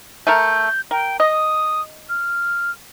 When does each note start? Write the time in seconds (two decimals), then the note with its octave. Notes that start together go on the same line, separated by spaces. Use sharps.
0.27 A3 A4 A#4 G6
0.91 A#4 G5
1.20 D#5 D#6
2.09 F6